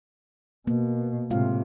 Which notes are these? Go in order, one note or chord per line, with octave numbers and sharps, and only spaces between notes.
B2 A#3
A2 C3 G#3 F4 F5